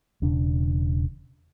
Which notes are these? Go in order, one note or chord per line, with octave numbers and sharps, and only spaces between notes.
E1 C#3 D4